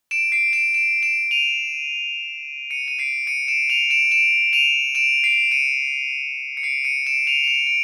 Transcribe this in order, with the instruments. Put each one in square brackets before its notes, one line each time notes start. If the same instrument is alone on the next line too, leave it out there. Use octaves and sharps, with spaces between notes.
[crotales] D7 E7
C7 D7
D7 E7
D7 E7
D7 E7
D#7 F7
C#7 D#7
D#7
C7 D7
C#7 D#7
D7 E7
D#7 F7
D7 E7
D7 E7
D#7 F7
D7 E7
C7 D7
C#7 D#7
C#7
C7 D7
C#7 D#7
D7 E7
D#7 F7
F7
D7 E7
D7